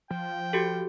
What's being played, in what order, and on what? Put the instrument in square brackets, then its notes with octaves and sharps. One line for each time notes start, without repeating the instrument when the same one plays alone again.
[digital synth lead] F3 [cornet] G5
[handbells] F#4 G4 A4